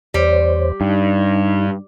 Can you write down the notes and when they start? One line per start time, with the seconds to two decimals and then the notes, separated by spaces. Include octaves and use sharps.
0.14 E2 G3 C5 C#5
0.81 G2 D#4